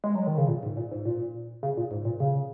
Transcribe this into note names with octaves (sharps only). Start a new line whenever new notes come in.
G#3
F#3
D#3
C#3
A#2
G#2
A#2
G#2
A#2
C#3
A#2
G#2
A#2
C#3